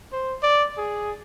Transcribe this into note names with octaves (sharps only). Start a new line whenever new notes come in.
C5
D5
G#4